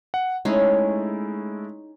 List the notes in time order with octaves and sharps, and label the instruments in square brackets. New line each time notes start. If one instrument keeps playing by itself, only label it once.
[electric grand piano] F#5
[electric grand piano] G#3 A3 E4 [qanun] C#4 D#4 G#4